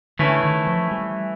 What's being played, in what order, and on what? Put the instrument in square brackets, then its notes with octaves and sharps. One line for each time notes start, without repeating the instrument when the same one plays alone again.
[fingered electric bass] D3 [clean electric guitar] E3 A3 C#4 E4
[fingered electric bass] D#3
F3
G3